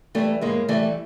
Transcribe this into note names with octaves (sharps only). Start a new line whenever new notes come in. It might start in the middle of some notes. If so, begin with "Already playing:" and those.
E3 G3 A3
A2 G#3 A#3
E3 G3 A3